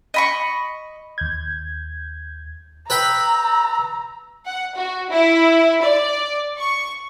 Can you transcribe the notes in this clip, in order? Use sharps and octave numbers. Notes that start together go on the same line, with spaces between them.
D#5 B5 C#6
D#2 G6 G#6
B4 G5 A#5 B5 E6
F#5
F#4
E4
D5
C#6